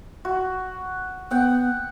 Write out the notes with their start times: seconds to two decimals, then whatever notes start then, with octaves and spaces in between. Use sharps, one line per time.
0.25 F#4
1.31 B3 F#5 G5